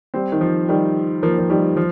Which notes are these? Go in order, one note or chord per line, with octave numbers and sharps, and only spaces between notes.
G3 C4
D#3
F3
D#3 G3
F3 A#3
F3
D#3 G3
F3